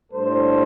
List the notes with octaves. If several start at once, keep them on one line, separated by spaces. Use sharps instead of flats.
A2 G3 D4 A4 C5